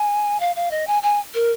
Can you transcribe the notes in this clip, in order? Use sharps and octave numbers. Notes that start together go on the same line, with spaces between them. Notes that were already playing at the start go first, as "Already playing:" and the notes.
Already playing: G#5
F5
F5
D#5
G#5
G#5
A#4